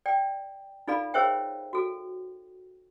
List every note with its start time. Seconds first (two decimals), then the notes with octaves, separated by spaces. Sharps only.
0.06 D5 G5
0.88 D#4 F4 A4 D5 F5 B5
1.14 G#4 A#4 C5 C#5 E5 G5
1.73 F#4 A4